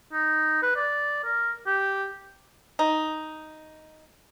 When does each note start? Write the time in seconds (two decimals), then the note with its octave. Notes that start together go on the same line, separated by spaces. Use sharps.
0.12 D#4
0.62 B4
0.76 D5
1.24 A#4
1.66 G4
2.79 D#4